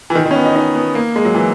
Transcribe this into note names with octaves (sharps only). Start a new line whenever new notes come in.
E3
D#3
D#3
C#4
B3
D#4
D#4
B3
A#3
G#3
F#3
E3